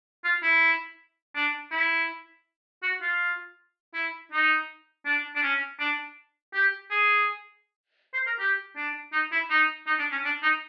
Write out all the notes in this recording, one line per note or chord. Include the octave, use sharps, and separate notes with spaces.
F4
E4
D4
E4
F#4
F4
E4
D#4
D4
D4
C#4
D4
G4
G#4
C5
A#4
G4
D4
D#4
E4
D#4
D#4
D4
C#4
D4
D#4